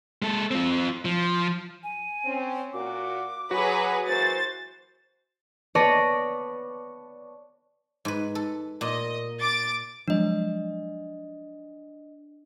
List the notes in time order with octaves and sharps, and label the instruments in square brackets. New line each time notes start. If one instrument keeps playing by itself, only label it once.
[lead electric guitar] G#3 A4
C4 F4
F3
[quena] G#5
[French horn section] C4 C#4
[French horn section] A#2 F#4 [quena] D6
[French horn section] F#3 [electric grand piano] F#4 [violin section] G#4 B4
[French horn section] E3 F#3 A#3 [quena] C5 [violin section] A6
[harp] B3 C#5 D5 A5 A#6 D#7
[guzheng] G#2 B4
A4
[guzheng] A#2 [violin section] D#5
[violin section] D6 A6
[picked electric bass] F3 F#3 G#3 [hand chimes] D4 D#5